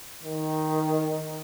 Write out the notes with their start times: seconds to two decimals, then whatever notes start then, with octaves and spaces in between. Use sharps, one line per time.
0.23 D#3